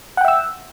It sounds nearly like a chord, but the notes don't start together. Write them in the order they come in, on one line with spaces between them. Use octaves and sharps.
F#5 G5 E5 E6